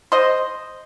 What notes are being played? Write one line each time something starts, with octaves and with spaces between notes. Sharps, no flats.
C5 D#5